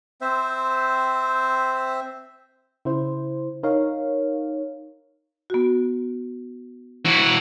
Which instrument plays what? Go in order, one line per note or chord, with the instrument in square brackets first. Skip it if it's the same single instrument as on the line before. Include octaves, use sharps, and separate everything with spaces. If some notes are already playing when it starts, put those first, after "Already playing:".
[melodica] C4 C5 E5
[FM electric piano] C#3 E4 C5
D#4 A#4 C#5 F5
[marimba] B3 F#4
[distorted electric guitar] E3 F#4